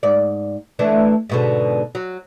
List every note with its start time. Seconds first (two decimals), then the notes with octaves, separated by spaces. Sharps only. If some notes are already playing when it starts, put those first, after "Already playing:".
0.03 G#2 D5
0.79 E3 A3 D4
1.29 G#2 B2 D3
1.95 F#3